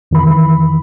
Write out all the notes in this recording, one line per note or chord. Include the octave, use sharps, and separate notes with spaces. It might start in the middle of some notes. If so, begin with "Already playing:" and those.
F2 D#3 E3 B5